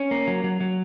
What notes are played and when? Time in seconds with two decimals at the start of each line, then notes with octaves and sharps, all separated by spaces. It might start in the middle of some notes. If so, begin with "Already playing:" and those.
Already playing: C#4
0.11 A#3
0.27 F#3
0.44 F#3
0.60 F#3